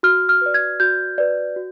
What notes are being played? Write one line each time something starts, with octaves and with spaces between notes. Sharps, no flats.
F#4 F6
F6
B4 D5
G#6
F#4 G6
B4 D5
F#4